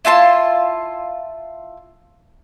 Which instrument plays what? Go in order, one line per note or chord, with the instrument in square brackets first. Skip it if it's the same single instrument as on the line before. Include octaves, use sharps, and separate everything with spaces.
[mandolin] E4 F4 A5 C6